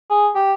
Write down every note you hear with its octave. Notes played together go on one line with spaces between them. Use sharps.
G#4
G4